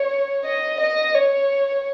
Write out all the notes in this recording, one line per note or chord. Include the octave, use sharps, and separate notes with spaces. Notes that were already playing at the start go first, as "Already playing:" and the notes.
Already playing: C#5
D#5
D#5
C#5